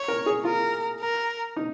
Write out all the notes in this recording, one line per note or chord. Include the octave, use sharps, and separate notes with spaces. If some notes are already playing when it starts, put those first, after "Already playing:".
Already playing: C#5
A#4
G#4
F4 A#4
A#4
D#4